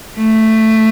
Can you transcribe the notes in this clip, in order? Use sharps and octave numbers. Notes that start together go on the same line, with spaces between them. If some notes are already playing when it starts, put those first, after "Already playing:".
A3